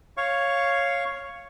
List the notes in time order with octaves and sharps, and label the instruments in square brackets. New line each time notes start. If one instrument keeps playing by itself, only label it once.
[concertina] C#5 F5 C#6